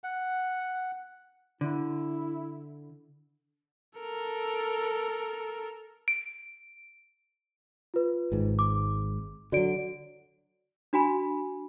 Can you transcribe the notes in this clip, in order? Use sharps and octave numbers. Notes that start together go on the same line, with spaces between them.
F#5
D3 E4
A4 A#4
D7
F4 B4
G#1 G#2
D6
D3 F#3 F#4 D5 D7
D4 F#4 G#5 B5